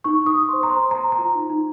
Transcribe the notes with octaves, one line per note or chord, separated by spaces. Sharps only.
D#4 C#6
D#4 D#6
D#4
C5 C6
A#5
C5 C6
C5
A#5
C5
A#5
F4
D#4
D#4